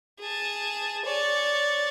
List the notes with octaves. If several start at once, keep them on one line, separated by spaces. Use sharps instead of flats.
G#4 A5
C#5 D5